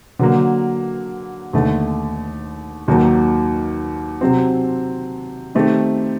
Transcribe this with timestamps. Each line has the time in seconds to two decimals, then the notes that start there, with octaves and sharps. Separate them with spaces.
0.19 D3 F#3 A#3
1.53 D#2 D3 A3
2.88 D#2 D#3 F#3 A#3
4.21 C3 F#3 C4
5.55 D#3 A3 C4 G4